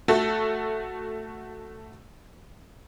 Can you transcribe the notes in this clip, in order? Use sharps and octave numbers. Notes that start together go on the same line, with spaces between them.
A3 F#4 A4